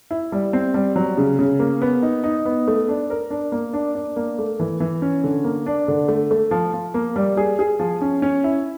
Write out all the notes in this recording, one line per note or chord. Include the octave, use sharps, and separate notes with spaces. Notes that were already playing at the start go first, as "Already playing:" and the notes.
E4
G3
C4
G3
F#3
C#3
C#3
A#3
B3
D#4
D#4
B3
A3
D4
A#4
D4
A#3
D4
D4
A#3
A3
E3
E3
C#4
D3
A#3
D4
D3
A3
A3
F3
F3
A#3
G3
G#4
G#4
F3
C#4
C#4
E4